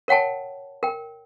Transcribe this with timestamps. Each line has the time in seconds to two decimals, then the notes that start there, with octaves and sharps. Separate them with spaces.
0.08 A#4 C#5 F#5 G5 A5
0.83 A#4 G5